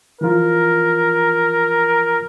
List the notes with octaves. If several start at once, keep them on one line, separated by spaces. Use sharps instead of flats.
E3 F3 F4 A#4